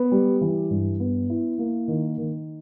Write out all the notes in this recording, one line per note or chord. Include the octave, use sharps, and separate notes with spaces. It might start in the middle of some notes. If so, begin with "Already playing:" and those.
Already playing: B3
G3
E3
G2
B3
E4
A#3
D#3
D#3